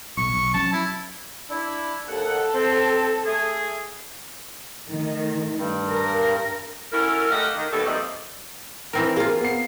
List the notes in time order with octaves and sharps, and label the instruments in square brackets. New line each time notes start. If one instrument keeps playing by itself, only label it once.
[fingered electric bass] B1 [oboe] C#6
[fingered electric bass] B1
[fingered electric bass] F#3 C#4 [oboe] A5
[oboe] E4
[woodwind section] D4 E4
[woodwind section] D#2 F#5 [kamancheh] A4
[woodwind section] C4
A3 G#4
[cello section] D#3 A3
[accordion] G2
[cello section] A#4
[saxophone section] C#4 E4 F#4 A4 A#4
A3 G4 A#4 D#5 F5 F#5
D#3
D#2 B2 G3 F#4 A4 E5
F3 G3 A3 A#3 C4 D#4
[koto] E3 C4 A#4
[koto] A#3 F4 [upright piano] G#4
[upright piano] B3 C7